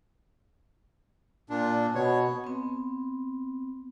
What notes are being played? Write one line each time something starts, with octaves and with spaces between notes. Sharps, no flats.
A#2 D4
B2 C#5
B3 C4